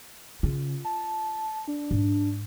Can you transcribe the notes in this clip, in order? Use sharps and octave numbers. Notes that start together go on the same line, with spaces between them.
C#3 F4
A5
D4
G#2